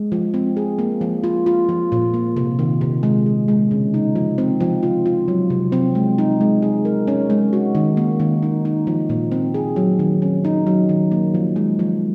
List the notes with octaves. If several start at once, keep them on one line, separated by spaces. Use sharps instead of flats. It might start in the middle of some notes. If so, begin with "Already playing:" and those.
Already playing: G#3
F3
C4
G#4
A#3
F3
F4
F4
F3
A#2
A#3
C3
D#3
C3
G#3
G#4
G#3
C#3
D#4
F3
C4
F3
F4
F4
F#3
C3
C4
G#3
D#4
G#3
G#4
A#4
C#4
G#3
F#4
D#3
A#3
D#3
D#4
D#4
F3
A#2
C4
G#4
F#3
D#3
C#4
D#4
F#3
D#3
A#3
F3
G#3
F3